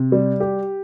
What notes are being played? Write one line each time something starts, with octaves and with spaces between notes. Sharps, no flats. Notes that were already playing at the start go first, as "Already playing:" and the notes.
Already playing: C3
G3
G4